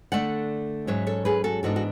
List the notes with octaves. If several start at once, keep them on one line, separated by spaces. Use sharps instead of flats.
D3 A3 D4 D5 F#5
G#2 F#3 C#4 C#5 E5
A4 C#5
G#4 B4
F#4 A4
G#2 E3 B3 D4 F#4 A4
F#4